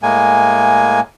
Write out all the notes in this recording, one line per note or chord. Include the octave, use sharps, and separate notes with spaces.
A2 G#3 A#3 G#5